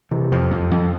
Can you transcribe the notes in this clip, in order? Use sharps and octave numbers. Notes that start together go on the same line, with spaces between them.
C3 E3
F2 F3
F2
F2